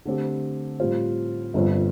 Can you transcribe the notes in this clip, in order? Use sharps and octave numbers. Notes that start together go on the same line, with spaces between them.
D3 A3 C4 G4
A2 G3 C4 F4 C5
G1 G2 F3 C4